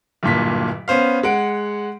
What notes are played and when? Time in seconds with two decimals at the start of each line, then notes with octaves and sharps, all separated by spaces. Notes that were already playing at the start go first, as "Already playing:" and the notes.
0.23 D1 G2 A#2 B6
0.88 B3 C#4 C5 F5
1.23 G#3 F#5 D7